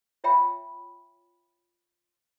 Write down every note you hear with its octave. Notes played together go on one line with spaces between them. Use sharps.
F4 C#5 E5 G5 B5